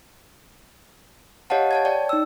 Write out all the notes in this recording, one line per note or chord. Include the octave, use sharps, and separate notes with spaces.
G4 C#5 D#5 F5 F#5 A5
C#5 A5 G#6
D5 G5
D#4 E6